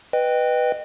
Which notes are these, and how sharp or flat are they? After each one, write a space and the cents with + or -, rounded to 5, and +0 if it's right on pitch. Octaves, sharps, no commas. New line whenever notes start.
B4 +0 D#5 -25 G5 +0